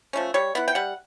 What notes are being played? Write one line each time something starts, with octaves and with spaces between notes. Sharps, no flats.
F3 A3 C#4
G3 C#5
B3 E4 F#5
G5
G3 F#5